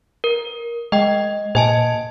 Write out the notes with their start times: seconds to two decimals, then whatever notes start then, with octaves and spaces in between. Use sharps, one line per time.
0.24 A#4
0.92 G#3 D#5 G5
1.55 A#2 D#5 G#5 A5